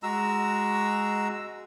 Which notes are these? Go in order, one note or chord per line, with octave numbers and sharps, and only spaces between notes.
G#3 F#4 A#5 E6